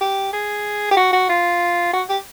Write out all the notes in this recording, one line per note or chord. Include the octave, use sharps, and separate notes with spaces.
G4
G#4
G4
F#4
F#4
F4
F#4
G4